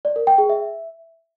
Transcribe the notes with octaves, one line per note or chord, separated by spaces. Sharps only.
D5
A#4
G5
G#4
E5